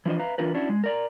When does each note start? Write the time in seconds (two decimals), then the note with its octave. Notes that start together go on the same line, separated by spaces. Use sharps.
0.06 E3 F3 D4 C5 D#5
0.19 B4 E5 F5 A#5
0.38 E3 D4 F4 A#4 B4
0.54 C#4 D4 E4 F#4
0.69 G#3
0.84 A#4 D5 A#5